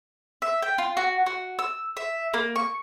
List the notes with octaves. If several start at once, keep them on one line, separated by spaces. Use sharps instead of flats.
E5
G5
F4
F#4
F#4
E6
E5
A#3
C#6